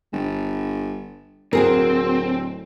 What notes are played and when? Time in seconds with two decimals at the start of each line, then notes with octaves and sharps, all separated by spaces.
0.13 G1
1.53 D1 C4 F#4 G#4 A#4